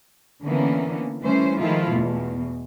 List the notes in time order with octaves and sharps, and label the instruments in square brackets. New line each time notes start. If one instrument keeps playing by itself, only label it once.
[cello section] D3 E3 A#3 B3 C#4
E3 G3 A3 C#4 C5
D#3 F3 G#3 A3 E4 F4
E2 B2